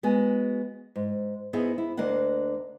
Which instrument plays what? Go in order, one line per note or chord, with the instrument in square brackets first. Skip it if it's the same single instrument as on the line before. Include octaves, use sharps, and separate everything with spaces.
[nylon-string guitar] G#3 B3 F#4 G#5
G#2
B3 D#4 E4 G#4 C5
E4
D2 A#3 D4 D#5 F#5